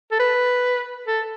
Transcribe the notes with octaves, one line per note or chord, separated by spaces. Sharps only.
A4
B4
A4